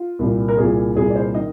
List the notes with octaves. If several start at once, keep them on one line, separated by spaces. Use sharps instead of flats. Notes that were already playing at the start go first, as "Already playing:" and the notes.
Already playing: F4
C2 A#2
A#4
C2 A#2 G#4
C2 A#2 G#4
D5
C5
D#3 D#5